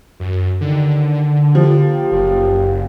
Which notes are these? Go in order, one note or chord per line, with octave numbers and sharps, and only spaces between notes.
F#2
D#2 D3 D#3
F3 A#3 F4 G4
F#1